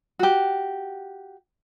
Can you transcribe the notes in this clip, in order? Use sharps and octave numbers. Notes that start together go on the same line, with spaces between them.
F#4 G4